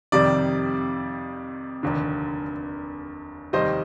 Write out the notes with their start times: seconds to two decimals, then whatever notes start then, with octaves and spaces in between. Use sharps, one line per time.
0.12 F2 C3 D#3 G3 D5
1.83 F1 D#2 D3
3.53 F1 D#2 D#3 G3 C5 D#5